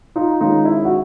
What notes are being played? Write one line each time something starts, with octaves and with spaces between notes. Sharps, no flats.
D#4 F4
D#3 G#3 C#4 D#4 F4
E4
F#4